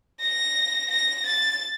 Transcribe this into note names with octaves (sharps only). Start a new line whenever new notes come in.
A#6
A#6
A6